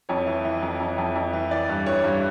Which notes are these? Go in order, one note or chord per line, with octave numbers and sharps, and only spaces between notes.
F2 C#5
E3
E3
F2
F2
F2
F2
E3
E3 D5
G2
E3 C#5
G2